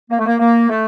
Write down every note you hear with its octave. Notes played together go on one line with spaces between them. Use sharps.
A#3
A3
A#3
A#3
A3